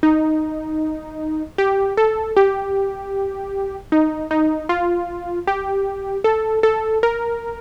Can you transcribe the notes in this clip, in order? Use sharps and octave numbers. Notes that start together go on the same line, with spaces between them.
D#4
G4
A4
G4
D#4
D#4
F4
G4
A4
A4
A#4